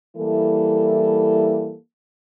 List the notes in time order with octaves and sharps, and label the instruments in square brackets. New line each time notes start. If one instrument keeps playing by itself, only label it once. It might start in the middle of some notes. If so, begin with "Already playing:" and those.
[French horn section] E3 G3 A#3 E4 A4